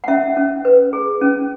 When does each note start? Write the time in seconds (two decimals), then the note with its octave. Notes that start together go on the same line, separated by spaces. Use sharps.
0.04 F#5
0.08 C#4 E5
0.37 C#4
0.65 B4
0.93 G#4
1.21 C#4